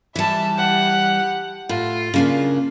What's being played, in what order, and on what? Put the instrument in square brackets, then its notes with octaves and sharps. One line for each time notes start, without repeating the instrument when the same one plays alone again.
[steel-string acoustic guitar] E3 G3 [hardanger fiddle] E5 A5
[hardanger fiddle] G4 F#5
[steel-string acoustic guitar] A2 [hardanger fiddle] F4
[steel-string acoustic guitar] C#3 A#3 D4